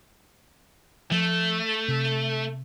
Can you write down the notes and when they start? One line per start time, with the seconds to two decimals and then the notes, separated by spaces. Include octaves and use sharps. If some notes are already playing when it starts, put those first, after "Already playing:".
1.11 F3 A3
1.88 C3